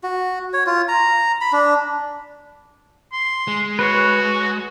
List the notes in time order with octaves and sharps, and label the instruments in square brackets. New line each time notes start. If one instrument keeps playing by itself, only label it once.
[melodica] F#4
C#5
F4
A#5
B5
D4
[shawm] C6
[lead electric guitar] G#3
[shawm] F#4 [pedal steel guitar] B4 C#5